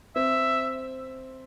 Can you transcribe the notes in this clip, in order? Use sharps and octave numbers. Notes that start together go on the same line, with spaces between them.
C4 E5